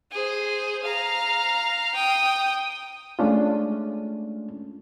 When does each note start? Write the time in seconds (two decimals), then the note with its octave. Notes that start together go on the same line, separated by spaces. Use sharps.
0.12 G#4 C5
0.84 F5 A#5
1.95 G5 D#6
3.19 G#3 A3 C#4 D4 F4